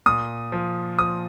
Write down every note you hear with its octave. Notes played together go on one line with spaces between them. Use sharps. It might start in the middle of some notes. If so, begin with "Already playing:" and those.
A#2 D#6
F3
F3 D#6